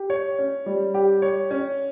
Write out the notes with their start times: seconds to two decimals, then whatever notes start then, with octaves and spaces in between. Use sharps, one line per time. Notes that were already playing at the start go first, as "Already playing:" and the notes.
Already playing: G4
0.10 C#5
0.38 C#4
0.66 G3
0.94 G4
1.22 C#5
1.51 C#4